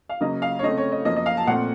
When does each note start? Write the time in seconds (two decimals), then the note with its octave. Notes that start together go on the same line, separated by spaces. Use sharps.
0.09 F5
0.20 C#3 F#3 A#3 D#5
0.42 F5
0.59 C#5
0.63 C#3 A3 C4 D#5
0.77 C#5
0.92 D#5
1.05 F#2 F3 A#3 D#5
1.16 D#5
1.26 F5
1.37 A5
1.47 A#2 A3 C4 F#5